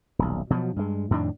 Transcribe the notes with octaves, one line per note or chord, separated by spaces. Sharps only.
D#1 B1
B2 F3 F#3
G2 G#3
F2 A2 D#3 D4